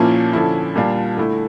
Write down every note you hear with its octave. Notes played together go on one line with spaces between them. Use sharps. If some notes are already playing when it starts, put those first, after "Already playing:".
Already playing: A#2 F3 A#3 C#4 E4
D3 F3 C#4 E4
A#2 G3 D4 F4
D3 A3 E4